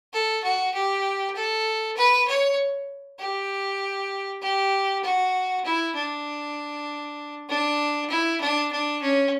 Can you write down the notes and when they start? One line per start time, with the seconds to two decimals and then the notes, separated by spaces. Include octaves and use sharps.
0.13 A4
0.44 F#4
0.74 G4
1.35 A4
1.97 B4
2.28 C#5
3.19 G4
4.42 G4
5.03 F#4
5.65 E4
5.95 D4
7.49 D4
8.10 E4
8.41 D4
8.72 D4
9.02 C#4